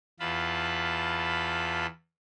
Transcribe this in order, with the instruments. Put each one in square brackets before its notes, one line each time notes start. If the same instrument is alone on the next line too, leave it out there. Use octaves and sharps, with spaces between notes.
[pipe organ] E2 F4 A5 B5